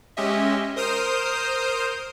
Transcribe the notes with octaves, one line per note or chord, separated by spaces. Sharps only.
G#3 C#4 G4 D#5 E5
A#4 C5 D#6 F6 G6